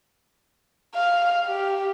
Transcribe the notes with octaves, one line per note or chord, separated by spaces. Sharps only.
F5
G4